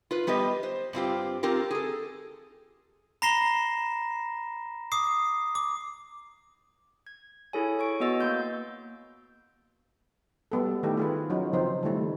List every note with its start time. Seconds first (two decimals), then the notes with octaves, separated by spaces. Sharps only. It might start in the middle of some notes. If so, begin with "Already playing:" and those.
0.11 F4 B4
0.27 G3 B3 G4 B4 D#5
0.63 C5
0.93 G2 C4 F4 G4
1.43 C4 F4 G4 A#4
1.71 G#4 A4
3.22 A#5 B5 A#6 C7 E7 G7
4.92 D6 D#6 C7
5.55 D6
7.07 G#6
7.53 E4 G#4 A4 C#5 G#5
7.79 C#5 C#6 D7
8.00 B3 F#4 D#5 E6 A6
8.21 A#3 C6 G6
10.52 G3 B3 A4
10.83 D#3 A3 E4 G4 A4
10.97 F4 G#4 B4
11.30 F#3 C#4 D#4 F4 F#4
11.53 C#3 F3 C4 D#4 C5
11.83 D#3 G3 A3 E4